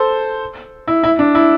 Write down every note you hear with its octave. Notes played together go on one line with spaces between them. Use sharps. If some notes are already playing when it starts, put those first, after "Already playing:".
Already playing: A4 C5
E4
E4
D4
E4